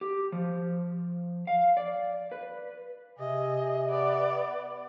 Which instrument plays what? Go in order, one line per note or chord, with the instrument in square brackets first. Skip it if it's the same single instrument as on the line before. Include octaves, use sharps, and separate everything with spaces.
[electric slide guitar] G4
F3
F5
D5
B4
[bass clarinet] C3 [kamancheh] G#4 D#5
[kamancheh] B3 D5